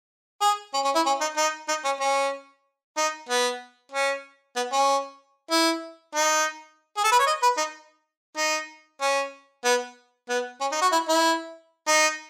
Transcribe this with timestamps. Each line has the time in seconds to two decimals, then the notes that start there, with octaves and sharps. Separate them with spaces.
0.42 G#4
0.74 C#4
0.85 C#4
0.95 E4
1.06 C#4
1.21 D#4
1.37 D#4
1.69 D#4
1.85 C#4
2.01 C#4
2.97 D#4
3.29 B3
3.92 C#4
4.56 B3
4.72 C#4
5.51 E4
6.15 D#4
6.97 G#4
7.04 A4
7.12 B4
7.19 C#5
7.27 D#5
7.43 B4
7.58 D#4
8.37 D#4
9.02 C#4
9.65 B3
10.29 B3
10.61 C#4
10.72 D#4
10.82 F#4
10.92 E4
11.09 E4
11.88 D#4